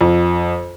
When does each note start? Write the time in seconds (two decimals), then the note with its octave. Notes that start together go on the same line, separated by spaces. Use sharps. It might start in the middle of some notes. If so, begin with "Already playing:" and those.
0.01 F2